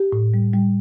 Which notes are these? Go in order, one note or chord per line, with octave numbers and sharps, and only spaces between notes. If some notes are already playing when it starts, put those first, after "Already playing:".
Already playing: G4
A2
G3
G3